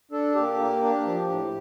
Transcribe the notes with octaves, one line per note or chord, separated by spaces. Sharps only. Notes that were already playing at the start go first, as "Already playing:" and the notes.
D4 A4
A#2 G4
A#3
D4
F3
A2